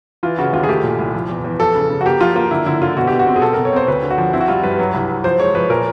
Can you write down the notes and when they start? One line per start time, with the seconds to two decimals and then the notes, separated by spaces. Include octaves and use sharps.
0.23 E3 F4
0.38 C#3 F#4
0.53 D#2 F4
0.63 G#4
0.68 A3 G4
0.84 A#2
0.99 C2
1.14 F3
1.29 E2
1.44 E2
1.60 F3 A4
1.75 C#3
1.90 C#3
2.01 F#4
2.06 A#3 G4
2.21 F3 F4
2.36 A#3 F4
2.51 D3 E4
2.66 D3 E4
2.82 D3 F4
2.97 B2 F#4
3.07 B2 G4
3.19 F#4
3.27 C4
3.36 G#4
3.42 B2 A4
3.53 B2 A#4
3.65 C#5
3.72 C4 C5
3.88 D2 B4
4.03 D3
4.10 F#4
4.18 F3
4.33 C4 E4
4.41 F#4
4.48 G3 F4
4.63 G2 B4
4.79 F#3
4.94 C2
5.09 F#3
5.24 F3 C5
5.40 G#3 C#5
5.55 F3 B4
5.70 A#2 A#4